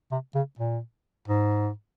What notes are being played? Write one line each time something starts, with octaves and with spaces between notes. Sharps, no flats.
C3
C#3
A#2
G#2